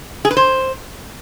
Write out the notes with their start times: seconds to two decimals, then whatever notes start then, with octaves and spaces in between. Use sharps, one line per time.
0.25 G#4
0.31 B4
0.37 C5